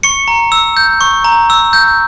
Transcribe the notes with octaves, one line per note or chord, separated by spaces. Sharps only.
C#6 C#7
A#5
E6
G6
C#6
A#5
E6
G6